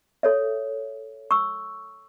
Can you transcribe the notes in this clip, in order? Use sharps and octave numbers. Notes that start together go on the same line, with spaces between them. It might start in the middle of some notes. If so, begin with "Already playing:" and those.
A4 C#5 E5
C#6 E6